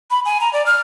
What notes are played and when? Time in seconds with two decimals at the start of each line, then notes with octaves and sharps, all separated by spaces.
0.11 B5
0.25 G#5
0.41 A#5
0.53 D5
0.66 F6